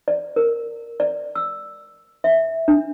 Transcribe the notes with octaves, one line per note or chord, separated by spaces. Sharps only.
D5
A#4
D5
E6
E5
D4